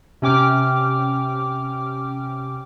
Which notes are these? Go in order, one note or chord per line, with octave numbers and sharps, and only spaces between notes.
C3 C#4 G5 D6 F6